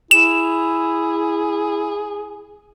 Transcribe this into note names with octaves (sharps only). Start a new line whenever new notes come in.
E4 G#4 E7